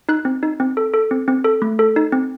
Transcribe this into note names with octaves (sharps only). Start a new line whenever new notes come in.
D#4 F#6
C4
D#4
C4
A4
A4
C4
C4
A4
A3
A4
D#4
C4